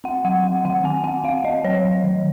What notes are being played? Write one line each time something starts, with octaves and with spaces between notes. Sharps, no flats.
C4 F#5
F#3 F#5
C4 F#5
D#3 F#5
C4 G#5
C4 F#5
C4 F5
C4 D#5
F#3 C#5
F#3
D#3